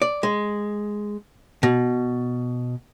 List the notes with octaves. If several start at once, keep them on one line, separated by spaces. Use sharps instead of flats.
D5
G#3
B2